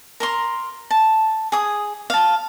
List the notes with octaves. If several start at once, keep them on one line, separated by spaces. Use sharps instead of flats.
A#4 A#5 C6
A5
G#4 D#6
F5 A5